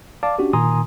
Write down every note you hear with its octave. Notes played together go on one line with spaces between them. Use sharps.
D5 F5 A5 D6
C#4 D4 F#4 G4
A#2 D#3 G#5 A#5 C6 D#6